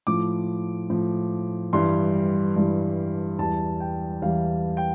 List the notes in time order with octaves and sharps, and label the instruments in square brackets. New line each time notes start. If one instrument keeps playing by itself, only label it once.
[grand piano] A2 F3 D6
A2 F3
G2 E3 G3 C6
G2 E3 G3
E2 E3 G3 A5
G5
E2 E3 G3 F5
G5